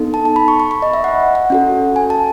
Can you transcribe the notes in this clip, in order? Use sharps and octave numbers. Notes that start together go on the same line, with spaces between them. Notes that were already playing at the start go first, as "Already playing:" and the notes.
Already playing: B3 D#4 A4
A5
A5
B5
C#6
C#6
B5
D#5
E5
F#5
F#5
C#4 F#4 A4
G#5
A5